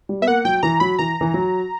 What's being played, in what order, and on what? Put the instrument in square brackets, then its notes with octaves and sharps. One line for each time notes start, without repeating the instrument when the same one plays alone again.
[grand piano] G3
[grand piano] B3 [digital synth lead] E5
[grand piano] A#3 [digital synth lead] F#5
[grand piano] F#3 [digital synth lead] G5
[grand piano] E3 [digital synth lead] A#5
[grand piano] F#3 [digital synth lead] B5
[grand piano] E3 [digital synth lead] A#5
[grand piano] E3
F#3